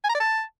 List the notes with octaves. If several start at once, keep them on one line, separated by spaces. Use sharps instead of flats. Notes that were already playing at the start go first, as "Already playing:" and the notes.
G#5
A#5
D5
A5